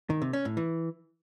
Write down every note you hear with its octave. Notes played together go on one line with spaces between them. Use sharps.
D#3
C3
C#4
A2
E3